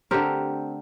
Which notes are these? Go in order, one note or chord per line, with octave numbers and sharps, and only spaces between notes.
D3 A3 C4 G4 A#4